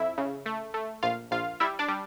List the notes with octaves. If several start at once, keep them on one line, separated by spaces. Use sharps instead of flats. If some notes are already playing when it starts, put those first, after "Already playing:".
Already playing: F2 E4 E5
C#3
A3
A3
A#1 F4 F5
A#1 F4 F5
G3 E4 E5
D4 D5
G3